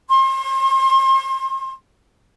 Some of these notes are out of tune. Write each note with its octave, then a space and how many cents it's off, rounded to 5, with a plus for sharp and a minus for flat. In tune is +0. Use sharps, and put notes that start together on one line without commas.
C6 +35